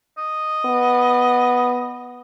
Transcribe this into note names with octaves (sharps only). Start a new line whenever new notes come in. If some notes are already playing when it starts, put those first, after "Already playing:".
D#5
B3